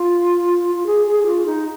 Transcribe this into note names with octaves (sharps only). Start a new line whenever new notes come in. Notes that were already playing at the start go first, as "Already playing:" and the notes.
Already playing: F4
F4
G#4
G#4
G#4
F4
D#4